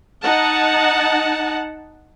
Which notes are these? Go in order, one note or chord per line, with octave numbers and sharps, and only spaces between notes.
D#4 F#5 A5